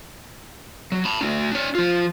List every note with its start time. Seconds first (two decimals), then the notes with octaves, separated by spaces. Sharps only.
0.92 F#3
1.05 A5 B5
1.21 A3 D4
1.52 D4 C#5
1.75 F3 F4